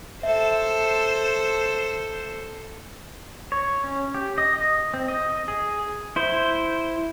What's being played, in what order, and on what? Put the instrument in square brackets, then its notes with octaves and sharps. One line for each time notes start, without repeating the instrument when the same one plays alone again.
[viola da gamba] A4 C5 [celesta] E5
[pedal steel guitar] C#5
C#4
G4
D#5
D#5
C4
D#5
G#4
E4 C5